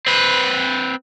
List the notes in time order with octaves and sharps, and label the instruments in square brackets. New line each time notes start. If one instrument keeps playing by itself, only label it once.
[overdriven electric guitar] C4 B4